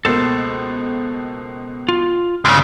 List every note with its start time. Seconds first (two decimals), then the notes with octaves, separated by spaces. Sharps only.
0.05 C#2 B2 A#3 A4 C5
1.89 F4
2.45 G1 D2 G2 C#3 D7